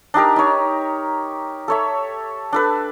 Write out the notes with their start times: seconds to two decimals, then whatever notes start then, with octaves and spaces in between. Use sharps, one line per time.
0.14 D4 D#4 G4 A#4
0.36 D#4 C#5
1.68 A4 C#5 E5
2.53 D4 A4 B4